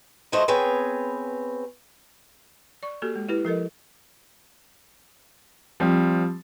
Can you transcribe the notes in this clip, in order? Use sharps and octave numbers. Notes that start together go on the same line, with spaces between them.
E3 F3 A3 F#4 C5 D#5
B3 C4 G#4 B4 C#5 G5
D5 C#6
A#3 F#4 G4 A4
G#3
E4 G4 B4
F3 A4 A#4 D#5
F3 G3 C4